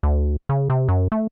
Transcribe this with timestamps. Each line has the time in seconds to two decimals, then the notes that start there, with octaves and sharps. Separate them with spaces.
0.03 D2
0.49 C#3
0.70 C3
0.88 F#2
1.12 A3